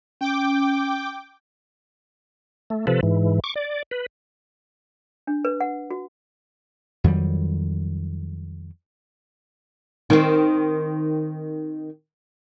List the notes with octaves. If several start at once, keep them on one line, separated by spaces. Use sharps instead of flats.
C#4 G5 D6
A3
C3 F3 A4 B4
G#2 E3
C#6 D6
D5
B4
D4
B4
F#5
F#4
F2 D#3 F#3 G3
D#3 C4